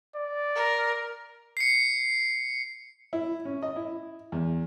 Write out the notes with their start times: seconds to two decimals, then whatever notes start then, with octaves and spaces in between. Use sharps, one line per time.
0.16 D5
0.55 A#4
1.57 C7 C#7
3.13 E4
3.45 C#4
3.63 D#5
3.76 E4
4.32 E2